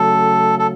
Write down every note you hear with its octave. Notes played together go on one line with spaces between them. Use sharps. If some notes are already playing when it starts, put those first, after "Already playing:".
Already playing: C#3 F#3 A3 A4
A4